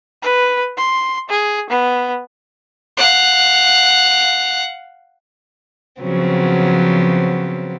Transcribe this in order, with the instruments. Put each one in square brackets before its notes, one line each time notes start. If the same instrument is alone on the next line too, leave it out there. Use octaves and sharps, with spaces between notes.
[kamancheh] B4
C6
G#4
B3
[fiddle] F5 F#5
[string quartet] C#3 F3 F#3 B3 C4